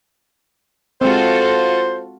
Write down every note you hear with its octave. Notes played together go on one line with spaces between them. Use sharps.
G#3 C4 F4 F#4 A4 C5